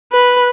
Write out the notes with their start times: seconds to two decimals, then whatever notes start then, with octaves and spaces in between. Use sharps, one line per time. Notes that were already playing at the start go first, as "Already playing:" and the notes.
0.12 B4